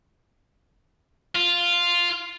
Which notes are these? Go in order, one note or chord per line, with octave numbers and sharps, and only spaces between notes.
F4